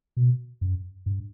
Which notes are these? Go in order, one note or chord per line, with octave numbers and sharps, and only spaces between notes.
B2
F#2
G2